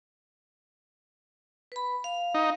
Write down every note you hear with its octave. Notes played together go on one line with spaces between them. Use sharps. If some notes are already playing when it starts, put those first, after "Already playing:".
B4 B5
F5
D#4